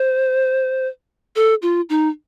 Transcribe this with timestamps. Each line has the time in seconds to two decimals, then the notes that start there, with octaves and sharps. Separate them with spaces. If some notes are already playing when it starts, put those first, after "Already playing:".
Already playing: C5
1.36 A4
1.62 F4
1.89 D#4